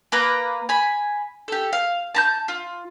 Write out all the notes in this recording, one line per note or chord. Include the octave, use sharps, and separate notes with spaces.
A#3 B4 A#5
G#5 B5
G4 A4
F5
A5 A#5 G6
F4